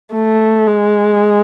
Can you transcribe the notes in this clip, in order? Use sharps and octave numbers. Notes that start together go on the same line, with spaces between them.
A3
G#3